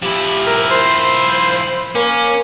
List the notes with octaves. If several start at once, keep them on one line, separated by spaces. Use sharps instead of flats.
F3 E4 G4
A#4
C5
A#3 C#4